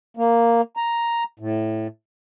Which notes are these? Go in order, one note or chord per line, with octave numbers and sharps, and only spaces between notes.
A#3
A#5
A2